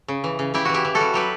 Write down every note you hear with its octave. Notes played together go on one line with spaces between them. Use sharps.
C#3
E3
C#3
C#3 E4 G4
E3 F#4
E4 G4
E3
F#4 A4
G3
F#3 G4 B4